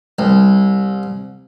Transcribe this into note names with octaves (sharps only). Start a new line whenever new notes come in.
C2